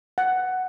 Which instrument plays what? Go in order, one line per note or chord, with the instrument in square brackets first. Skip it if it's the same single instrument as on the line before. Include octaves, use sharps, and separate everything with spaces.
[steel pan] F#5